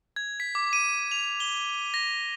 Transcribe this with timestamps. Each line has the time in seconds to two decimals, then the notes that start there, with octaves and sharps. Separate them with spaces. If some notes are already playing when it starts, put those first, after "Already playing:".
0.16 G#6
0.40 B6
0.55 D6
0.73 D#7
1.11 F7
1.40 G7
1.94 A#6